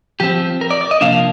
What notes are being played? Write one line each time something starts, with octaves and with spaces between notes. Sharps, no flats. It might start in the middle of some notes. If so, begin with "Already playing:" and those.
F3 C4 G4
A#4
D5
D5
D#5
C3 F3 A#3 D4 F5